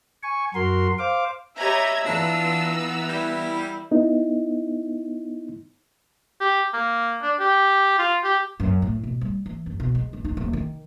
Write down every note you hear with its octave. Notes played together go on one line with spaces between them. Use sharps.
G#5 C#6
F#2 F#4 A#4 C6
C5 F5 D6
G4 C#5 D#5 E5 A#5 B5 G#6
E3 B3 D4 F4 A#5 E6
G3 E4
B3 D#4 E4
G4
A#3
D4
G4
F4
G4
F#2
A2
B2
G3
E3
F#2
B2
G#3
C#2
D#4
D#1
D#3